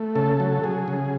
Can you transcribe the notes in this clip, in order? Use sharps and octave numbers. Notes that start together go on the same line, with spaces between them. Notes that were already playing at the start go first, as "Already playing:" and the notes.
Already playing: A3
C#3 A4
F#3
F#3 G#4
C#3